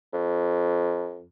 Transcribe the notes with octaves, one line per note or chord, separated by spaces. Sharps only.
F2